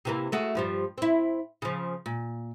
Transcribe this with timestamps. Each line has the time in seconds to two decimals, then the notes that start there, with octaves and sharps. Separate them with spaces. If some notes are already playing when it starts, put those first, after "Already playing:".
0.05 C3 E3 A#3
0.32 A3 F#4 G#4
0.55 G2 F3 G3
0.98 C4 E4
1.62 C#3 F3
2.06 A#2